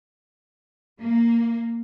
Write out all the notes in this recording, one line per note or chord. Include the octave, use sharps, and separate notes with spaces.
A#3